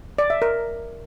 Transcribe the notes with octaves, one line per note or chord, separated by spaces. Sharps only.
D5
E5
A#4